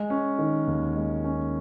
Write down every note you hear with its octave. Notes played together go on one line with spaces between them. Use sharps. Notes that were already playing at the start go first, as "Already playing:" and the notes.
Already playing: G#3
C#4
D#3
D#2
G#3
C#4